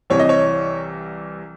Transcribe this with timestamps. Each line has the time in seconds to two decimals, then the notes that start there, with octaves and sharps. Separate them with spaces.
0.10 C2 C3 E3 C#5
0.19 D#5
0.29 C#5